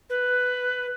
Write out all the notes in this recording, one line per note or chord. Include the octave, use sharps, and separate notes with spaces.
B4